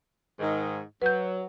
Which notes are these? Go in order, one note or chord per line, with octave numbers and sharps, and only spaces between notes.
G#2 D#3
F#3 B4 G6